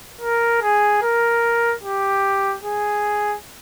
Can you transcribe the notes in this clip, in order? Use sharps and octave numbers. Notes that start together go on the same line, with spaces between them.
A#4
G#4
A#4
G4
G#4